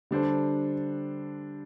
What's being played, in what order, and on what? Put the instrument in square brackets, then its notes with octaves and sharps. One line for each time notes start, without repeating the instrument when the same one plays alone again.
[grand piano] D3 G3 D4 A4 C5